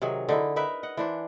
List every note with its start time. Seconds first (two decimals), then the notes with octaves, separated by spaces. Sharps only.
0.02 C3 D#3 F#3 G#4
0.29 D3 D#4 E4
0.56 D#4 A#4 B4 E5
0.83 D#5 F#5
0.97 E3 D4 C5